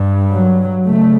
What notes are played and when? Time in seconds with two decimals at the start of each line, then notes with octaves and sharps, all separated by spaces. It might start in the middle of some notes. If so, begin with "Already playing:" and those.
Already playing: G2
0.31 F#3
0.86 C#3 A3